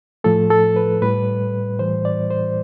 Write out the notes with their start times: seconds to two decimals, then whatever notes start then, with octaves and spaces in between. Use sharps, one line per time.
0.24 A2 F3 A3 A4
0.50 A4
0.76 B4
1.02 A2 G3 B4
1.79 A2 E3 G3 C5
2.05 D5
2.30 C5